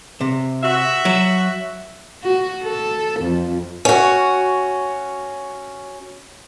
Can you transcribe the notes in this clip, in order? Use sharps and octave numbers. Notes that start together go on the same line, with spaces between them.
C3
F#4 E5
F#3
F#4
A4
F2
C#4 F#4